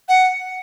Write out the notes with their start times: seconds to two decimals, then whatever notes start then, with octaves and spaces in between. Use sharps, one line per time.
0.09 F#5